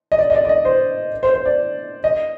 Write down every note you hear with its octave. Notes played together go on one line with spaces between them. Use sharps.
D#5
D5
D#5
D5
D5
D#5
C5
C5
C5
D5
D#5